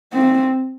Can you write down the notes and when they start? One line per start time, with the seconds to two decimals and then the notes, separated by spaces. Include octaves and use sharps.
0.13 C4